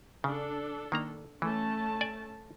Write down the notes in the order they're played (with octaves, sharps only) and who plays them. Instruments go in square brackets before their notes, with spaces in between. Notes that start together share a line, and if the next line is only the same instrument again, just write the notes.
[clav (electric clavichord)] C#3 [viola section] D4 A4
[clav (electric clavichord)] D#3 A#3 A#5
[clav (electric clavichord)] E3 [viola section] A3 C#4 A5
[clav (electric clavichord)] D5 G#5